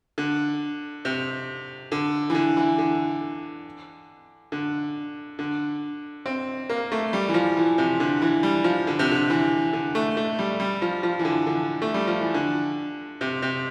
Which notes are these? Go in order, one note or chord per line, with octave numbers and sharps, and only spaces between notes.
D3
C3
D3
E3
D3
E3
D3
D3
D3
C4
A#3
A3
G3
E3
F3
E3
C3
D3
E3
G3
F3
D3
C3
D3
E3
D3
A3
A3
G3
G3
F3
F3
E3
D3
D3
A3
G3
F3
E3
D3
C3
C3